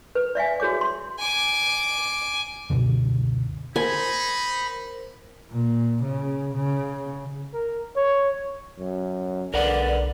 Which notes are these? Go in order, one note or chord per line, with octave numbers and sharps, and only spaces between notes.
B4
D5 E5 F5 G#5
F#4 G#4 C#5 D6
C6
G#5 D6
C#2 F#2 B2 D3
D#4 A#4 C5 G#5 B5
A#2
C#3
C#3
A#4
C#5
F#2
B1 D3 A#4 B4 D5 F#5